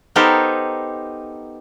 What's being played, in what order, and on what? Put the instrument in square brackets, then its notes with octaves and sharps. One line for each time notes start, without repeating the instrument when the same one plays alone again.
[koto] B3 D#4 G4 A4 A#4 C5